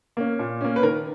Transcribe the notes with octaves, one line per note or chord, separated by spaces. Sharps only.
A#3 C#4
A#2
A#3 C#4
B4
D#3 A#4